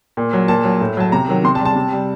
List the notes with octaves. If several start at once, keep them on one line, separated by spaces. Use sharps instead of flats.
A#2
F#3
A#2 A5
F#3
A2
F#3 A5
C3 A#5
D#3 F#3
C3 C6
A5
G3
A5
C3
G3